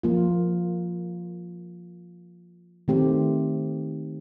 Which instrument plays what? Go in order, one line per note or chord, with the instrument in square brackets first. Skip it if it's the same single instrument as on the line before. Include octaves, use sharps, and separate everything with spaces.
[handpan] F3 A#3 F4
D#3 A3 C4 G4